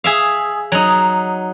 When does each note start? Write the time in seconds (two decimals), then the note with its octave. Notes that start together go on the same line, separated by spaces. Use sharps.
0.04 G#4 E5 F5
0.72 F#3 D#4